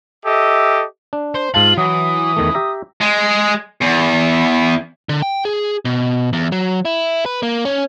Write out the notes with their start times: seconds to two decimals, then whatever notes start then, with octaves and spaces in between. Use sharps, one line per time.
0.25 G4 A4 D#5 E5
1.13 D4
1.35 C5
1.54 G#2 F4 F5 A5 F#7
1.78 E3 F#3 D#6
2.37 E2 D#3 A3
2.54 G4 E5 A#5
3.01 G#3
3.82 E2
5.09 D3
5.22 G5
5.45 G#4
5.85 B2
6.33 E2
6.52 F#3
6.85 E4
7.26 B4
7.43 A#3
7.65 C#4